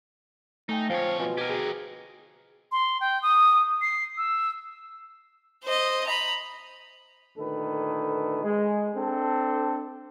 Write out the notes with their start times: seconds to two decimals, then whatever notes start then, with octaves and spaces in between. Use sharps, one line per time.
0.69 A3 D#4 G5 G#5 A#6
0.90 F2 F3 C#5 F5
1.20 B2 F3 G#5
1.38 F#4 G4 A#4 G#5
1.50 G#4
2.72 C6
3.01 G5
3.22 D#6
3.82 C7
4.17 E6
5.64 C5 D#5
6.07 A#5 B5
7.37 D2 A#2 D#3 A4 B4
8.44 G#3
8.95 C4 D4 A4